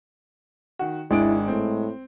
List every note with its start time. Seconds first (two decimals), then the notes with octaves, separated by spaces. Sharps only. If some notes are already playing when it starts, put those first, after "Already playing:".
0.79 D#3 F#4
1.11 G#1 G#3 D4 E4 D7
1.48 A2 C4